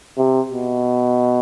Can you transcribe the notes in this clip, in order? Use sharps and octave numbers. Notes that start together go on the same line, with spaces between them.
C3
B2